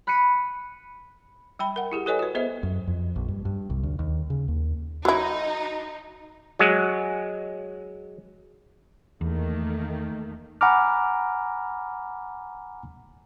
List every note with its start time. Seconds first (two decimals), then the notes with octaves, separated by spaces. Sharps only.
0.07 B5 F#6 B6 C#7 D#7
1.59 G3 G5 B5
1.76 A#4 F#5
1.92 E4 G4 G#4
2.06 G4 A4 B4 C#5 D#5 G#5
2.19 F#4 B4
2.35 B3 G#4 C5 D#5 E5
2.63 F#2
2.87 F2
3.16 A#1
3.28 G2
3.45 G2
3.70 C2
3.83 D2
3.99 D#2
4.30 C#3
4.48 D#2
5.05 F#3 D#4 E4 F#4
6.59 F#3 G#3
9.21 E2 D#3 A3 A#3
10.61 F#5 G#5 A#5 B5 D6 F6